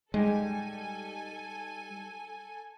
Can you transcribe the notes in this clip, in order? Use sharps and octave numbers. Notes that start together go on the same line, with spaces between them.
G3 G#3 D#4 G4 A4 G#5